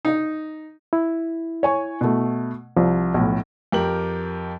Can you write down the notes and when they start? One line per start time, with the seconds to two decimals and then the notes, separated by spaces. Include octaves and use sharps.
0.05 D#4
0.93 E4
1.63 C#5 G#5 C#6
2.01 B2 A3
2.76 C2 F3
3.14 B1 A2
3.72 F2 G4 A#4 F#7